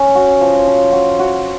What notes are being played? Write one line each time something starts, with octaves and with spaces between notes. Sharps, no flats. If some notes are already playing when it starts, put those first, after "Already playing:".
Already playing: C#4
F#4
F3
F3
F#4
F#4